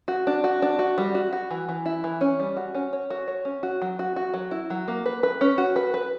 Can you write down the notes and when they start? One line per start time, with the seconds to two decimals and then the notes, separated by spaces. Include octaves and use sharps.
0.08 F#4
0.27 D4
0.44 F#4
0.62 D4
0.79 F#4
0.98 G3
1.15 F#4
1.33 F#4
1.51 E3
1.69 E3
1.86 E4
2.04 E3
2.21 C#4
2.40 G3
2.57 F#4
2.75 C#4
2.93 C#5
3.10 F#4
3.28 C#5
3.45 C#4
3.63 F#4
3.82 F#3
3.99 F#4
4.16 F#4
4.34 F#3
4.51 E4
4.70 F#3
4.88 A#3
5.06 B4
5.23 B4
5.41 C#4
5.58 F#4
5.76 B4
5.94 B4